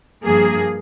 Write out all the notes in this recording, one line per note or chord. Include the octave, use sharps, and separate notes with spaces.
G2 F3 A#3 G#4